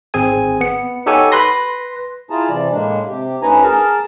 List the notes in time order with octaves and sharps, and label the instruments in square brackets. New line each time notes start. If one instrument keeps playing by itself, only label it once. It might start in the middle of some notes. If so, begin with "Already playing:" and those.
[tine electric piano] G#1 C4 G#4 G#5
B3 C#7
D#4 G4 A4 C#5 F#5 G#5
B4 B5 C6 A#6
[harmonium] E4 F4 G#4 A5 A#5
C3 E3 D5
A2 G#3 A#3 D4
C3 G4
D2 C#4 D#4 B4 G#5 A#5
G#4 A#4 A5